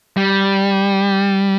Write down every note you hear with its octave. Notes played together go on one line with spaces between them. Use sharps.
G3